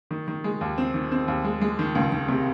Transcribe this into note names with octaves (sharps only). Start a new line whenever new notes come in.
D#3
D#3
G#3
D#2
C4
D#3
C4
D#2
G#3
G#3
D#3
C#2
D#3
C3